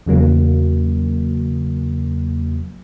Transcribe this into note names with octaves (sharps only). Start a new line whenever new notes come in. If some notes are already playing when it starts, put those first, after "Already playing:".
E2 C#3 F#3 A#3